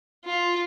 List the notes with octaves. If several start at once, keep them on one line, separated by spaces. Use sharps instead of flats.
F4